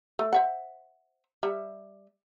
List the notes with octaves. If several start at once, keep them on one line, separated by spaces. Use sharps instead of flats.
A3
C5 E5 F#5
G3 E5